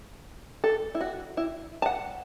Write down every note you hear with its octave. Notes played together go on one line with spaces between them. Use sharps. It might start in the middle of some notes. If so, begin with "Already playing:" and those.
A4
E4
F#4
E4
A5
F#5